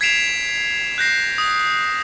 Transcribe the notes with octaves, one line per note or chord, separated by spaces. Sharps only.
G#6 B6 C7 D7 E7 F7
F#6 G6 A#6 C7
D#6